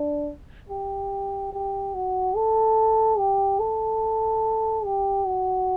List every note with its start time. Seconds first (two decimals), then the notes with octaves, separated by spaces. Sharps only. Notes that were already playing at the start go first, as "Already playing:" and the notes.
Already playing: D4
0.69 G4
1.53 G4
1.95 F#4
2.36 A4
3.18 G4
3.60 A4
4.85 G4
5.26 F#4